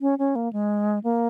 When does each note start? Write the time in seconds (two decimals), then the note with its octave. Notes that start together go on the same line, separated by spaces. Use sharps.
0.01 C#4
0.19 C#4
0.36 A#3
0.53 G#3
1.04 A#3